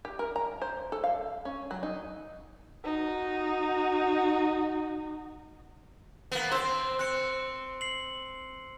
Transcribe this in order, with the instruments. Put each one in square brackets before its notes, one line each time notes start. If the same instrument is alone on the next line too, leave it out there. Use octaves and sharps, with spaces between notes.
[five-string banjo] G4
A#4
A#5
C5
A4
F5
C#4
F#3
D#4
[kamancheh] D#4 F#4
[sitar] A#3 B3
[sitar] C4 C5 [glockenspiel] C6 E6
[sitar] C4 [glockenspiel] F#6 C#7
[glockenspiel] C7 F#7